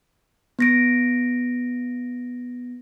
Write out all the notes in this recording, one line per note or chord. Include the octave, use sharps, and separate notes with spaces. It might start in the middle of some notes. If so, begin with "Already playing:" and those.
B3 A#6 D7